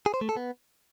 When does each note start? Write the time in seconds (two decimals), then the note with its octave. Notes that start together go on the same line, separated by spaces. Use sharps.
0.06 G#4
0.14 C5
0.21 A3
0.29 A4
0.37 B3